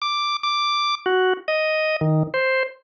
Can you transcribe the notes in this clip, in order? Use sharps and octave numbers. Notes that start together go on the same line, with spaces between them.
D6
D6
F#4
D#5
D#3
C5